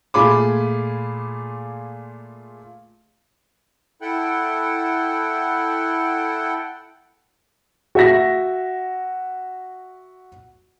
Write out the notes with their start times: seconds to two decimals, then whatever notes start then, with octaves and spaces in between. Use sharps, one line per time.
0.14 A#2 A3 F4 G#4 B5 D6
4.02 E4 A4 F#5 G5
7.95 F#4 E5 A#6